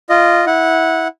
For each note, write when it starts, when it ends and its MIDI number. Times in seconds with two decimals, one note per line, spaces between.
0.10 0.45 65
0.10 0.45 75
0.47 1.08 64
0.47 1.08 78